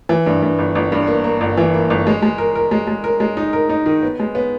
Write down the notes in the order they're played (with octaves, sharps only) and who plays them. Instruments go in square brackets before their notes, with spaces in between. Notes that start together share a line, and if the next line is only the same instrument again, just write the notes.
[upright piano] E3
G2
G2
G1
G1
G2
A#3
A#3
G1
E3
A#3
G1
G#3
G#3
A#4
A#4
G#3
G#3
A#4
G#3
D#4
A#4
D#4
D#3
B3
G#3
B3